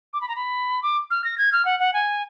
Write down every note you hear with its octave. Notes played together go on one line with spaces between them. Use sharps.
D6
B5
A#5
B5
D6
F6
A#6
G#6
F6
F#5
F#5
G#5